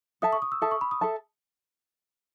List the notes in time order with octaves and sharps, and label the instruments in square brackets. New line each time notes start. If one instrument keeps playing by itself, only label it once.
[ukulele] A4 E5 A5 [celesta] D#6
[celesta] C#6
D#6
E6
[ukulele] A4 E5 A5 [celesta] D#6
[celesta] C#6
B5
D#6
[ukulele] A4 E5 A5